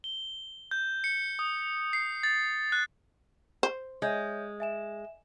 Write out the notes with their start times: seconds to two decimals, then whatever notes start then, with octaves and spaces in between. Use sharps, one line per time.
0.04 G7
0.71 G6
1.04 C#7
1.39 D#6
1.93 C7
2.23 A6
2.72 F#6
3.63 C5
4.02 G#3 C#5 E5 G6
4.60 E5 G#5 E7